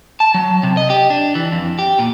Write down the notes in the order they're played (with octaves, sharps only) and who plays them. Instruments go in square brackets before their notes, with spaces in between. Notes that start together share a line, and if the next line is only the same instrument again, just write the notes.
[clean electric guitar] A5
F#3
C3
D#5
G4
D4
E3
F2
G4
A#2